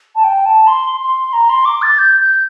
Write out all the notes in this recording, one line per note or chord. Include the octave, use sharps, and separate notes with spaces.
A5
G5
A5
C6
C6
A#5
C6
D6
A6
G6
G6